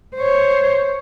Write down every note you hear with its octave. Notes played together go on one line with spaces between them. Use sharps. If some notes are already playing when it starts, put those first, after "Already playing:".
C5 C#5